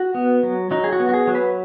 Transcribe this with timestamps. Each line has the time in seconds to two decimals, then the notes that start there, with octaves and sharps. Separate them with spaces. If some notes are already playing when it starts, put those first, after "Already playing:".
Already playing: F#4
0.15 B3
0.43 F#3
0.71 F#3 D#4
0.84 G#4
0.93 F#4
1.00 B3
1.09 F#4
1.14 G#4
1.27 F#3
1.35 B4